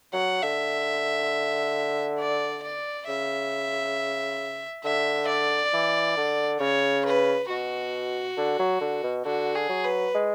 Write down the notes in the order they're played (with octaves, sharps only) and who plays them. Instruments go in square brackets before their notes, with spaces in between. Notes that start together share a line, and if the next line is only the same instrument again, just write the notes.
[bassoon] F#3 [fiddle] F#5
[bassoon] D3 [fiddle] E5
[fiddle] D5
D5
[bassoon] C#3 [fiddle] E5
[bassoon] D3 [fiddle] E5
[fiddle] D5
[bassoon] E3
D3
[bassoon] C#3 [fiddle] C#5
[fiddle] B4
[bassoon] B2 [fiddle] F#4
[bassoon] D3
F#3
D3
B2
[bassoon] D3 [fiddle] F#4
[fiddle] G#4
[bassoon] F#3
[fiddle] B4
[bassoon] G#3